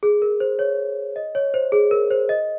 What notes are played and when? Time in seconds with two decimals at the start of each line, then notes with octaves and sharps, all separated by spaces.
0.03 G#4
0.22 A#4
0.40 C5
0.59 C#5
1.16 D#5
1.35 C#5
1.54 C5
1.72 G#4
1.91 A#4
2.11 C5
2.29 D#5